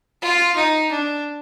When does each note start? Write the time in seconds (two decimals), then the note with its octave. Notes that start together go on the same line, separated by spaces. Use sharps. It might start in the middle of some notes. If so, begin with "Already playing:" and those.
0.22 F4
0.57 D#4
0.92 D4